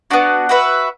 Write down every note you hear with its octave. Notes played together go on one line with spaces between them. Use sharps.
B3 D4 F#4
F#4 B4 E5